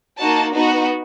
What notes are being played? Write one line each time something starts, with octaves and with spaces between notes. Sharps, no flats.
A#3 D#4 F#4 A5
B3 D#4 F#4